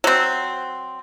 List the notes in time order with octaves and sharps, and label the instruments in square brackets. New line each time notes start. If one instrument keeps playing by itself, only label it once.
[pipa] F#3 C4